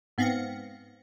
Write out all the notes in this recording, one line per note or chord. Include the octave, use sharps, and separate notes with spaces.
G#2 B3 C4 F5 A#6 C#7